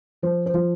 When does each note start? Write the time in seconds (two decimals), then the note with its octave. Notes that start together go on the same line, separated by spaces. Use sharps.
0.22 F3 C5
0.46 C5
0.54 F3